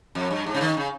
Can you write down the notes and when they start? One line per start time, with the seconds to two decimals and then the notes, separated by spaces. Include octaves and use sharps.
0.15 F2
0.30 G2
0.46 G#2
0.54 C#3
0.61 D#3
0.77 C#3